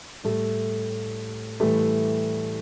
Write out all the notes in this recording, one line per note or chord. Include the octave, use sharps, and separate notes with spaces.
A2 G3 A3
A2 E3 G3 A3